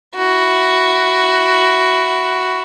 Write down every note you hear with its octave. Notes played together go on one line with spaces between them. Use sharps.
E4 F#4